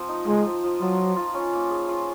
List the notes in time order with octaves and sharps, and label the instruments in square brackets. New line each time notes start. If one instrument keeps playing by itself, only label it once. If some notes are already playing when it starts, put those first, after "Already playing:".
Already playing: [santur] F3 C4
D#4
[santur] F3 [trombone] G#3
[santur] F3
F3
[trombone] F#3 [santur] F4
[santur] A#4
F4
C#4
A#3
G#4
F4